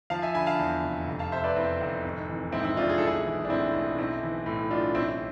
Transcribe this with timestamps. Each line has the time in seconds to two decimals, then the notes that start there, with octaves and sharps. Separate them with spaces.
0.10 F3 F5 A5
0.22 E5 G#5
0.34 D3 G#5 B5
0.46 F5 A5
0.59 E2
0.83 F1
1.07 F1
1.19 F5 A5
1.32 C3 C5 E5
1.44 B4 D5
1.56 E2 C4 E4
1.81 F1
2.04 G#1
2.29 E3
2.52 G#2 C4 E4
2.64 C4 E4
2.77 G#1 D4 F4
2.89 G#4
2.98 B1 A4
3.07 E4 G#4
3.26 E3
3.45 D4
3.50 A2 C4 E4
3.74 B1
3.98 B1 C4 E4
4.23 E3
4.46 A2
4.71 B1 D4 F4
4.95 A1 C4 E4